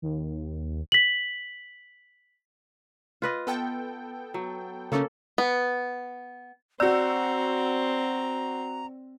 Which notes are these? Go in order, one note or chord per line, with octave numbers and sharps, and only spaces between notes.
D#2
B6 F#7
F4 B4 D#5
B3 A4 G5
F#3
C#3 A3 A#3 C#4 A4
B3
C4 F#4 D5 A#5 E6